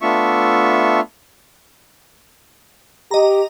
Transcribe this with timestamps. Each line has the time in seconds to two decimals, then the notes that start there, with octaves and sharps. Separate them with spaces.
0.02 A3 B3 D4 F4 E5 C#6
3.11 G4 D#5 A#5